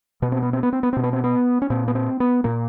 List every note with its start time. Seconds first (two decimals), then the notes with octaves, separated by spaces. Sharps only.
0.22 B2 B3
0.32 C4
0.42 B3
0.53 C4
0.63 B3
0.73 C4
0.83 B3
0.93 B2 C4
1.03 B3
1.13 C4
1.24 B3
1.62 C#4
1.70 A#2 C4
1.88 B3
1.95 C4
2.20 B3
2.44 A#2 A#3